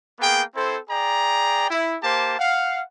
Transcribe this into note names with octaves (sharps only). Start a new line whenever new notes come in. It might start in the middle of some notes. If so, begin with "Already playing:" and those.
A#3 B3 G#4 G5
C4 E4 A4 C5
G#4 D5 G5 A#5
E4
A#3 G4 C5 A5
F5 F#5